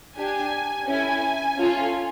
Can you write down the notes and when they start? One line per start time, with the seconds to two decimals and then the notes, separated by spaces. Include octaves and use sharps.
0.16 D4 G4 G#5
0.86 C#4 E4 A4 G#5
1.58 C#4 F4 A4